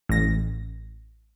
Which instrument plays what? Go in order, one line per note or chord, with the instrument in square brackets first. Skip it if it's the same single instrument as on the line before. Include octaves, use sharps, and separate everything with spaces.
[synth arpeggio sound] A1 A#6